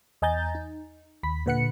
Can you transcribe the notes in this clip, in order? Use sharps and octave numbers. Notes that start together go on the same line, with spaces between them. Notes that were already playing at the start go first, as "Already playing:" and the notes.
E2 D#5 G#5 A#5 G6 A6
D#4
D#2 B5 B6
A#2 D3 B4 F#5 F#6 C#7